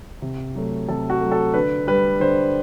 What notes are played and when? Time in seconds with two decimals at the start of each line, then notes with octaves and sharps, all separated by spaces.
0.22 C3
0.55 F#3 A3
0.88 C3 A4
1.10 F#4
1.21 F#3 A3
1.32 A4
1.54 D3 B4
1.87 G3 B4
2.20 D3 C5